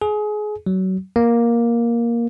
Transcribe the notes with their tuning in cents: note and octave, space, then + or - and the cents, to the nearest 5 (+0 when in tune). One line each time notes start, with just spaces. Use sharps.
G#4 +25
F#3 +25
A#3 +10